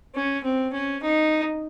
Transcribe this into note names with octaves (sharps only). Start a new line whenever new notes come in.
C#4
C4
C#4
D#4